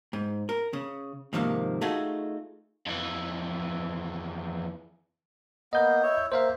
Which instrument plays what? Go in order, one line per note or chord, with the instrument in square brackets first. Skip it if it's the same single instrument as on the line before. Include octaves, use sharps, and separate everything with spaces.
[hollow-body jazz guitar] G#2
A#4
C#3
G#2 C3 D#3 F3 A#3
A3 D#4 F4 F#4 G#4 A4
[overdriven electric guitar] F2 E3
[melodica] A#3 B3 [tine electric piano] D#5 G6
[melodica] E4 C#5
[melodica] A#3 [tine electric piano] C5 E5 F5